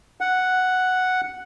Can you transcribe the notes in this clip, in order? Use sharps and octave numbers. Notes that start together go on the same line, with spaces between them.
F#5